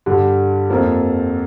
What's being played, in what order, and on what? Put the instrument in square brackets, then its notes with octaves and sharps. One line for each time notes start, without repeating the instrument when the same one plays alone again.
[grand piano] G2 D3 G3
F2 F3 A#3